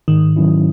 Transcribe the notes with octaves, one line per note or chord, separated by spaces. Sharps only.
G#2 D#3
D#3 F#3 C#4 E4